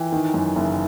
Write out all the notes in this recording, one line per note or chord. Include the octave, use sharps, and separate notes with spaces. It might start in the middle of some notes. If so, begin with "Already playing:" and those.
Already playing: E3 G5
D#3
F#2
F#1